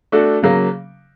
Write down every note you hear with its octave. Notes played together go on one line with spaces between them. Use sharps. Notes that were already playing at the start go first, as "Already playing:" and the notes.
A3 D4 F#4 A4
C#3 F#3 A#3